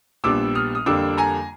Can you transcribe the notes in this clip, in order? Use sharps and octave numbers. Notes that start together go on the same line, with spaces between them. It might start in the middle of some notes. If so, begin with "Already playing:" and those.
A#1 A#2 G3 B3 D4 D6 E6
D#6 F6
D#6
F2 D3 G3 A#3 D4 D6 E6
G#5 A#5